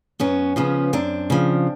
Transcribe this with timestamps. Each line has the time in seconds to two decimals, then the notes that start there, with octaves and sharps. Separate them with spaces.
0.20 F#2 B3 C#4
0.56 C#3 F3 B3 C#4
0.93 F#2 C4 D4
1.30 C#3 F3